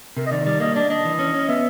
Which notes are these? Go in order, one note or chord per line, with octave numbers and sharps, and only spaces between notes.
C3 A#4
D#5
D#3 D5
G3 D5
A#3 D#5
D4 D5
D4 D#5
E3
C#4
C#4
B3 E5